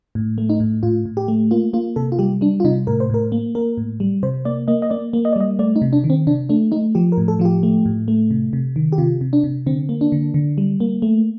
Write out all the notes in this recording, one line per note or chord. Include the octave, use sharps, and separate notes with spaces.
A2
A3
D#4
A2
A2 F4
A2
G4
A3
A#3 F4
A#3 F4
C3 A4
F4
G3 G4
G3 D4
F4
C3 D#4
A2 A#4
C5
A2 A#4
A#3
A#3 A#4
A2
G3
C3 C5
A#3 D5
A#3 D#5
D#5
A#3 D5
A#3
D#5
D5
G3 D#5
A3 D5
D#4
C3
D4
D#3
C4
C3 D4
A3 D4
A3 D#4
F3 G4
A#4
A2
A4
F3 F4
G4
A3
A2
A3
C3
C3
D#3
G4
C3 F4
C3
D4
C3
D3 C4
A#3
D4
D3
D3
G3
A#3
A3